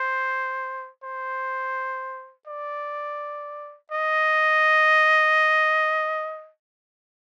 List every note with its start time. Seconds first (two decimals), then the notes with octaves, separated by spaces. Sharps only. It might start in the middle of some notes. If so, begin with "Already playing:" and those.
Already playing: C5
1.04 C5
2.47 D5
3.92 D#5